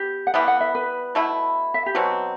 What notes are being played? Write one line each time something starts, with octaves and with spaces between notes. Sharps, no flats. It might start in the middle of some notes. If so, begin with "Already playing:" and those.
Already playing: B3 G4
F#5
E3 G3 B3 E5
F#5
E5
B4
B2 A3 E4
E5
G4
B2 F#3 C4 F#4